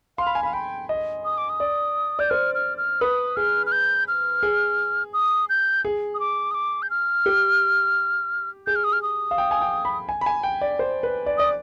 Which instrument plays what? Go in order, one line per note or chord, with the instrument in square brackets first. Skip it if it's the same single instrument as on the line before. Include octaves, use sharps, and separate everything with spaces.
[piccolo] F5 [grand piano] C6
[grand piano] B5
G#5
[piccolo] F5 [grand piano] B5
[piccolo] G5 [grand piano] B5
[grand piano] D#5
[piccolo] D#6
D6
D#6
[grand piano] D5
[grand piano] D5 [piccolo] G6
[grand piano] C5 [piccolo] F6
[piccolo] F6
F6
[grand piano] B4 [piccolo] D#6
[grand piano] G#4 [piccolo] F6
[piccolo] F6
G6
F6
[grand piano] G#4
[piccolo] D#6
G6
[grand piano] G#4
[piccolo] D#6
D6
D#6
D6
G6
F6
[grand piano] G4
[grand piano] G#4 [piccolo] G6
[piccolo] F6
D#6
F6
D#6
[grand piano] F5
G5
G#5
G5
B5
G#5
B5
G#5
G5
D5
C5
B4
D5
[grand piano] D5 [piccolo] D#6